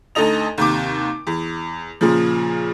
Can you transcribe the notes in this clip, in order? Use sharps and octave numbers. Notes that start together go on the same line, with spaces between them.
D2 D#4 A4 D#5 F7
D#2 C3 D6
E2
A#2 C#3 F3